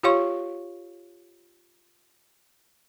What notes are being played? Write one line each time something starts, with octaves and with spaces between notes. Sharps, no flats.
F4 G4 C#5 F5 C6 C#6